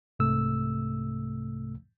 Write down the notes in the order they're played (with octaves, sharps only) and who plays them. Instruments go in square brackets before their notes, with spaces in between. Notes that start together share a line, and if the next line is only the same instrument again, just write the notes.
[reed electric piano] C2 G#2 C3 A3 E6